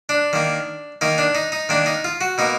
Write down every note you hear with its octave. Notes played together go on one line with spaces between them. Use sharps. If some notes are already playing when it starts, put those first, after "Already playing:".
D4
D#3 A#3
D#3 A#3 D#4
D4
D#4
D#4
D#3 A#3 D4
D#4
F4
F#4
B2 A#3 D#4